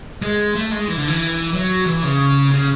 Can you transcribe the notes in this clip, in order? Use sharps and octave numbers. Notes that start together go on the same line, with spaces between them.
G#3
A3
G#3
E3
D3
E3
F#3
E3
C#3
C#3